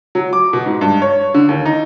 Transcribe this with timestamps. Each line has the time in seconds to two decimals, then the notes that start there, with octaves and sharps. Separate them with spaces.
0.15 F#3
0.33 D6
0.53 B2
0.66 G#2
0.81 G2
1.02 C#5
1.34 D3
1.49 D#2
1.66 D#4